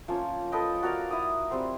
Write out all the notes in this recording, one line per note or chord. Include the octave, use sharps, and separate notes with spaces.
F3 A#3 C#4
A4 B4 D#5 G5
F#4 A#4 D5 F5
E4 D#6
G3 C4 C5